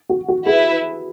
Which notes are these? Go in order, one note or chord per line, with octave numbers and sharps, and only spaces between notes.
F#4
F#4
E4 G#4 B4 E5